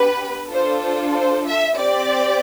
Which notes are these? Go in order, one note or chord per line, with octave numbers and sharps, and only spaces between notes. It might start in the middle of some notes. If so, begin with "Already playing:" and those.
Already playing: B3 D4 G4 B4
D4 F4 A4 C5
C5
C5
E5
C4 G4 D5